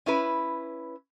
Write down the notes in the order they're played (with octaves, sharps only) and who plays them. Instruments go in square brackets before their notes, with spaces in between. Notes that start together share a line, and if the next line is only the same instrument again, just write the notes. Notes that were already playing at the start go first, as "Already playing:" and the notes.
[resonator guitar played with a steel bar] C#4 E4 B4